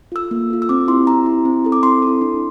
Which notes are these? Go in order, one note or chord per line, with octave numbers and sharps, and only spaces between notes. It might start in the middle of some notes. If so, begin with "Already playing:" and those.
F4 A4 E6
A#3
F4 A4
E6
C4 D6
E4 G4 C6
C4 A#5
E4 G4
C4
E4 A4
D6
C4 C6
E4 A4
D4